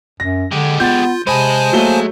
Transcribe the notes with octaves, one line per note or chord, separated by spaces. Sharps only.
F#2 A#6
D3 G#3 G4
B3 F4 G6 A6
C3 G#3 C5 D#5 G#5 A5 B5
F#3 A3 A#3 G7